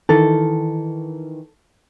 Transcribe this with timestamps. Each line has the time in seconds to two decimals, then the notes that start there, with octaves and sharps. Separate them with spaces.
0.09 D#3 E3 A4